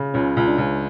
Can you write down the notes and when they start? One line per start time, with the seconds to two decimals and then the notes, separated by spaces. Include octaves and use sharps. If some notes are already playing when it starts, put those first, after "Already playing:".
Already playing: C#3
0.14 C#2 C#4
0.37 C#2
0.48 D4
0.58 C#2